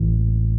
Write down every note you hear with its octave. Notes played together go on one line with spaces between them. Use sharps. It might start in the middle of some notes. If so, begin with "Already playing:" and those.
Already playing: A1 A2 E3